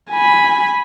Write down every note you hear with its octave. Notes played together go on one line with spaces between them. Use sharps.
G#5 B5